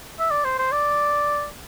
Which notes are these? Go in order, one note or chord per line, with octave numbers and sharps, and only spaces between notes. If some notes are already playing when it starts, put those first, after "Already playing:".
E5
D5
C5
C5
D5